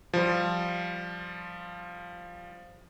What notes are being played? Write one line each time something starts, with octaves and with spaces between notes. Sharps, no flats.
F3 G3